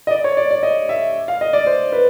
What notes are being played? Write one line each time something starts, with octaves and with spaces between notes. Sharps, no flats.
D#5
D5
C#5
D5
D5
D#5
E5
F5
D#5
D5
C5
B4